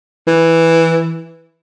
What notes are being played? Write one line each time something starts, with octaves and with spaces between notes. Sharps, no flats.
E3